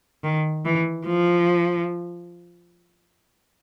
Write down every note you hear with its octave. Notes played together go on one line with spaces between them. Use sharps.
D#3
E3
F3